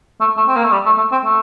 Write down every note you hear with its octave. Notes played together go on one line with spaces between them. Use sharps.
A3
A3
C4
A#3
A3
G3
A3
A3
C4
A3